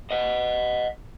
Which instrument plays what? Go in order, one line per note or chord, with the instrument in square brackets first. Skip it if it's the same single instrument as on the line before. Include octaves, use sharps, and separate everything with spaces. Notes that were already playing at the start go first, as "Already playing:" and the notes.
[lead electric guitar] D#5 F#5